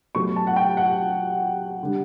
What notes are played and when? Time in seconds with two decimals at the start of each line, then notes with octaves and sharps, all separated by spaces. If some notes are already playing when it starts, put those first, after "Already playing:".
0.15 B2 F#3 A3 C#6
0.36 A5
0.47 F#5
0.56 G5
0.77 F#5
1.83 D3 G3